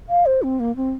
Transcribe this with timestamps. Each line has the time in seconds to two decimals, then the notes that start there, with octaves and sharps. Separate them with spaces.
0.09 F5
0.26 C5
0.43 C4
0.60 A#3
0.76 C4